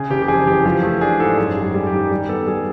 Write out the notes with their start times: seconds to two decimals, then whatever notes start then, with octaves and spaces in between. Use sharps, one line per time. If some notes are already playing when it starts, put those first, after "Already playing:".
Already playing: C#3 G#4
0.10 F#1 G4
0.22 G4
0.28 F2 G#4
0.47 E3 G4
0.65 F3 G4
0.83 A3 G#4
1.01 D4 G#4
1.20 G#2 A4
1.38 F#2 G#4
1.57 G3
1.63 G#4
1.74 G3
1.87 G4
1.93 D#3
2.11 G3
2.29 B3 A4
2.47 G3 G#4